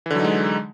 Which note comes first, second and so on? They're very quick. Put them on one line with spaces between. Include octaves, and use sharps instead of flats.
E3 D3 F#3 D#4 G#3